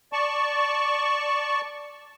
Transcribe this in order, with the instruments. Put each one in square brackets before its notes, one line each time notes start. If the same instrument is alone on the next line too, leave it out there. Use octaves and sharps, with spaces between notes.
[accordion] D5 A5 C#6